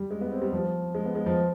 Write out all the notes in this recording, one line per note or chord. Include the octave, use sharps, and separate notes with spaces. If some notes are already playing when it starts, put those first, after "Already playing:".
Already playing: G3
G#3
B3
C4
G3
F3
G#3
B3
G#3
F3